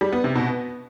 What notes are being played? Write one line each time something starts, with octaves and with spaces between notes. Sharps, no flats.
G3
B3
C3
B2
B3